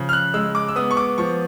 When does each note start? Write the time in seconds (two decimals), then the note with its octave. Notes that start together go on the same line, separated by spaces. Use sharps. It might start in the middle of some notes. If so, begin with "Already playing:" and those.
Already playing: C#3 F3
0.09 F6
0.13 F#6
0.34 G#3 E6
0.55 D6
0.68 E6
0.76 B3 D#6
0.91 C#6
0.97 D6
1.18 F3 C#6